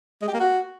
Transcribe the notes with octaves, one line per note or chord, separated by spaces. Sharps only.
G#3
G4
A#3
F#4